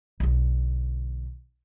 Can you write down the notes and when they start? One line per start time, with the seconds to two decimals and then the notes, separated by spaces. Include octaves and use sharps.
0.20 B1 D3